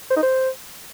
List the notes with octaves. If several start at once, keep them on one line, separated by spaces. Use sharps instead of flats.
C5
D#4
C5